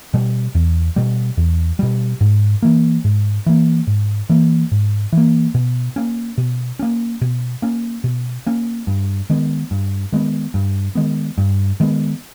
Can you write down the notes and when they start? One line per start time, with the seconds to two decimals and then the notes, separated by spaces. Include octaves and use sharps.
0.14 B2 G3
0.55 E2
0.96 B2 G3
1.37 E2
1.79 B2 G3
2.21 G#2
2.63 E3 A#3
3.04 G#2
3.46 E3 A#3
3.87 G#2
4.30 E3 A#3
4.72 G#2
5.12 E3 A#3
5.55 B2
5.96 A#3 C#4
6.38 B2
6.79 A#3 C#4
7.21 B2
7.62 A#3 C#4
8.04 B2
8.46 A#3 C#4
8.87 G2
9.30 D#3 G#3 B3
9.71 G2
10.12 D#3 G#3 B3
10.54 G2
10.95 D#3 G#3 B3
11.38 G2
11.80 D#3 G#3 B3